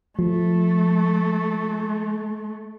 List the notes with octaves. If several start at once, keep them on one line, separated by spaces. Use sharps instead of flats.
F3 A3